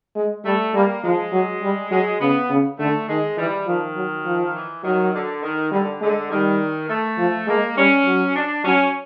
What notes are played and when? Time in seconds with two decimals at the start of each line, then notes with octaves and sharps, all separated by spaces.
0.16 G#3
0.45 G3 A3
0.74 G3 A#3
1.04 F3 G#3
1.33 F#3
1.62 G3
1.91 F#3 G#3
2.21 C#3 B3
2.50 C#3
2.79 D3 A3
3.09 D#3 G#3
3.38 E3 G3
3.67 D#3 F3
3.96 F#3
4.26 F3
4.54 E3
4.84 D#3 F#3
5.14 D3
5.43 D#3
5.72 D3 G3
6.01 D3 G#3
6.30 D#3 G3
6.89 A3
7.18 F3
7.47 G#3 A#3
7.77 G3 C#4
8.06 F#3
8.36 D4
8.64 F#3 C#4